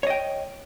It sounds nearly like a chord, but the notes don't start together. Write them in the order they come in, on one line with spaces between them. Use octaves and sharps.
C#5 D#5 G5